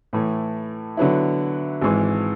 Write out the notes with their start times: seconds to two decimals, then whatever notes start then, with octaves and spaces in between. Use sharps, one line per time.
0.13 A2 E3 A3
0.97 D3 F#3 B3 E4
1.81 G#1 G#2 E3